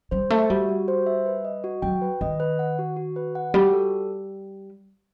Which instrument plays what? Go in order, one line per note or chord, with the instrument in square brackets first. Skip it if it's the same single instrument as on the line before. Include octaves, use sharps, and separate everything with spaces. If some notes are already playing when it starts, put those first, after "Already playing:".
[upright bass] G3 [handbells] C5
[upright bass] A3 [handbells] E5
[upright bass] G3 [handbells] F#4
[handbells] F#4
C5
E5
B4
D#5
F#4
[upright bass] F#3 [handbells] G5
[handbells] B4
[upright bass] D#3 [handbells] D#5
[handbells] B4
F#5
F#4
F#4
B4
F#5
[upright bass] G3 [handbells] F#4
[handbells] A4